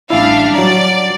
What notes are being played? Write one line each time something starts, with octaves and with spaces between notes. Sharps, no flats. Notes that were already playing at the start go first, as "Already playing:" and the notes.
A1 G3 D4 E4 F5
F#3 D5 A#5